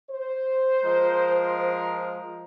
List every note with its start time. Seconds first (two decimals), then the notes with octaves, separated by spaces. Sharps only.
0.11 C5
0.83 F3 G#3 A#4